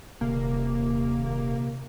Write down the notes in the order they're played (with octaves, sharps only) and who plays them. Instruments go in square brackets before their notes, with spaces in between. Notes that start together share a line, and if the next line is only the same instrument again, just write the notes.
[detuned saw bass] D#1 [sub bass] C3 [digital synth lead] A#3